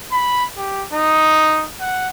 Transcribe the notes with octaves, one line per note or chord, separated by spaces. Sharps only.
B5
G4
D#4
F#5